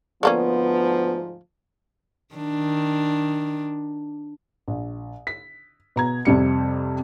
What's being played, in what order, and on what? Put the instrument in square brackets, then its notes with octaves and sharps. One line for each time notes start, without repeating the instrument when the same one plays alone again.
[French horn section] D2 G#2 F3 [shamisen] D3 A#3 C#4 [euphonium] B3
[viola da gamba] D#3 D4
[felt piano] A#1
B6
B2 A#5 G#6
F2 C3 G3 C#7